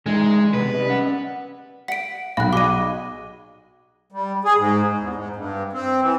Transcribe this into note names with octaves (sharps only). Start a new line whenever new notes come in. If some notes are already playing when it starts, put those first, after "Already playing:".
D3 E3 G#3 D#4
C3 B3 B4
G3 D#5
C#4 F#5
F#5 B6 D7
B1 F5 B5 F#6
F#4 G#4 D#5 D6 D#7
G3
G#4
G#2
E2
G#2
G2
C4
E3